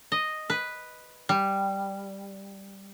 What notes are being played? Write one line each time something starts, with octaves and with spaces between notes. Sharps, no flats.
D#5
B4
G3